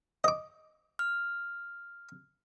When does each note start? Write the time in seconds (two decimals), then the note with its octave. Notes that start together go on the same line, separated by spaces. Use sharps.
0.24 D#5 D6
0.99 F6